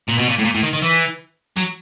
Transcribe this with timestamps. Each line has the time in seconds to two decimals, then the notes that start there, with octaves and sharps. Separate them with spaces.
0.08 A#2
0.18 B2
0.29 A#2
0.38 A2
0.45 A#2
0.55 A2
0.63 D#3
0.73 D#3
0.82 E3
1.57 F#3